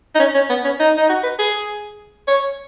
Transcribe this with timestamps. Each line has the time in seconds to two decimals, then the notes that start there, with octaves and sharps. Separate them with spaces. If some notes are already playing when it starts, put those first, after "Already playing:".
0.15 D#4
0.20 C#4
0.35 C#4
0.50 B3
0.65 C#4
0.80 D#4
0.97 D#4
1.09 F#4
1.24 B4
1.39 G#4
2.28 C#5